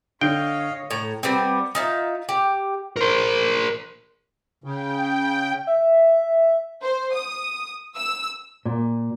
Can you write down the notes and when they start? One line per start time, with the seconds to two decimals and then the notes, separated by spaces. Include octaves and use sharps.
0.21 D3 C#5 D#5 F5 G5
0.90 A2 A#5
1.23 G3 B3 C4
1.75 D#4 F4 E5
2.29 G4
2.96 A#4 C5
4.64 C#3 G5
5.67 E5
6.81 C5
7.13 D#6
7.95 E6
8.65 A#2